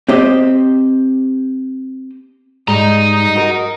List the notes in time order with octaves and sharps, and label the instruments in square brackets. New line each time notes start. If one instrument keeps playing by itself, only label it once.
[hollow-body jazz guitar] C4 G4 C5 D#5
[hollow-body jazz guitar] G#2 G3 G#3 [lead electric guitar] D#5 A#5
[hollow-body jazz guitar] F#4 A#4